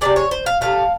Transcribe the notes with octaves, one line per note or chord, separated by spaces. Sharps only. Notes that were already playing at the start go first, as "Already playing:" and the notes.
C3 E3 G#3 D5
C#5
C5
F5
C3 F3 A3 F5